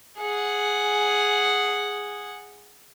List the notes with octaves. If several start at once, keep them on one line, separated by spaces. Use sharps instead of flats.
G#4 F#5